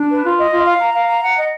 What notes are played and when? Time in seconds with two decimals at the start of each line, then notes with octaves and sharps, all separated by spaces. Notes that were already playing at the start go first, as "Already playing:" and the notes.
Already playing: D4
0.09 B4
0.24 F4
0.37 D#5
0.51 F4
0.65 F5
0.80 A#5
0.94 F5
1.09 A#5
1.23 F#5
1.37 D#5